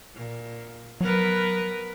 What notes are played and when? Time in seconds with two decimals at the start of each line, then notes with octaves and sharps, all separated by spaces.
0.14 A#2
1.01 F#3 B3 A#4 B4